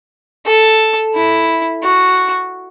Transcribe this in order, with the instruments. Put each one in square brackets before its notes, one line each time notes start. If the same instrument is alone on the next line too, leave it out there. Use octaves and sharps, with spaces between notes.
[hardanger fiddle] A4
E4
F#4